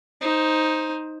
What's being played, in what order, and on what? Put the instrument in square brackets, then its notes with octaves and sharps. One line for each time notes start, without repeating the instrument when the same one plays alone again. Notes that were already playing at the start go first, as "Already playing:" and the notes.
[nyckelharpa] D#4 C5